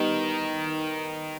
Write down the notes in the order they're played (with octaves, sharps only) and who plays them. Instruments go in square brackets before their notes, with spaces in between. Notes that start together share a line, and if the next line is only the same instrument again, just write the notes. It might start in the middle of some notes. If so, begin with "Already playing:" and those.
Already playing: [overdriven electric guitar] D#3 [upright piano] G3 B3 D#4 G4